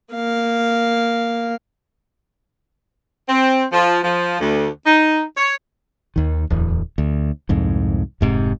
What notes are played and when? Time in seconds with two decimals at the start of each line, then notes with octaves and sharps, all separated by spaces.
0.14 A#3 F5
3.29 C4
3.72 F3
4.03 F3
4.40 D2
4.86 D#4
5.37 C#5
6.16 D#2 D#3
6.50 D1 E2
6.98 D2
7.49 C2 F2 G#2
8.21 F1 G#2 C3